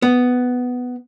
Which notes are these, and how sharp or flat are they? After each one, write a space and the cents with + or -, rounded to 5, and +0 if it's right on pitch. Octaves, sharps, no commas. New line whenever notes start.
B3 +5